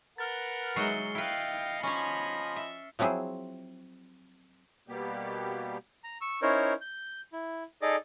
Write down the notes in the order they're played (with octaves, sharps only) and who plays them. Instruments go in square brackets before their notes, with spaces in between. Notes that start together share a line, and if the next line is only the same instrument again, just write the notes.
[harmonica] A#4 B4 F#5 [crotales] F6 A6
[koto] F#3 D#4 F#4 [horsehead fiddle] G#3 E5 [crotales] C7 C#7 G7
[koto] E4 B4 [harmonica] D#5 F5 [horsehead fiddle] G5
[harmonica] F3 D#5 G#5 [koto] C#4 C#5 [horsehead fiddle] B5
[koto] E5
F3 F#3 C4 E4 G#4 C5
[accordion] B2 G3 A#3 B3 G4
[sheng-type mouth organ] A#5
C#6 E6
C#4 D#4 E4 A#4 C5 C#5
G6
E4
D#4 G#4 A4 D5 D#5 D6